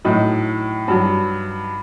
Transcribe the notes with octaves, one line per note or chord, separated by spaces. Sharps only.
A2 F#3 D#4
G2 F#3